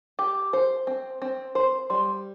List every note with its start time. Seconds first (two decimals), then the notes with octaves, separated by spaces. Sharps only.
0.19 G4 D6
0.53 C5
0.87 C4
1.22 C4
1.55 C5 C6
1.90 G3 C6